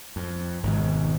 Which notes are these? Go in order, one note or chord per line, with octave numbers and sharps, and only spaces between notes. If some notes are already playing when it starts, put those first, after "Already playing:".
F2
G#1 G#2 B2